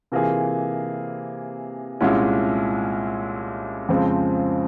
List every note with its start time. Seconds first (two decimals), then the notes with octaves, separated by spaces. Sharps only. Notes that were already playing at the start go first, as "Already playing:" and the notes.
0.12 C3 E3 A#3 F4 G#4
2.00 C2 A#2 G#3 C#4 E4
3.89 F2 C#3 F3 G#3 C4